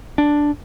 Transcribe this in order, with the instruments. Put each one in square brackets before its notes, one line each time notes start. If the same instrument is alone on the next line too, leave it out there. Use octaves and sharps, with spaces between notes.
[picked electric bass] D4